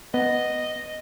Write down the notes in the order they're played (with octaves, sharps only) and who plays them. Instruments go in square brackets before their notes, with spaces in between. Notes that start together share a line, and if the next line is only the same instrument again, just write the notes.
[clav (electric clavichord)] B3 [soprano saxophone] D#5